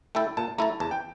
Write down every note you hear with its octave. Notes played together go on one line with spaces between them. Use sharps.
A3 E4 A4 G5
A#2 A5
A3 E4 A4 A#5
E2 A5
G5